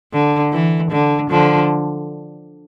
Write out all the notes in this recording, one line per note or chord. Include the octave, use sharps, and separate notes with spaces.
D3
E3
D3
D3 F3